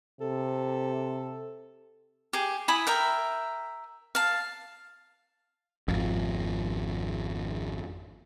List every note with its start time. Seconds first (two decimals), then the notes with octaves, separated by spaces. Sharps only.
0.21 C3 A4
2.33 G4 G#4
2.68 E4 G#5 B5 D#6
2.87 A#4 E5 G5
4.15 F5 A5
5.88 G#1 F2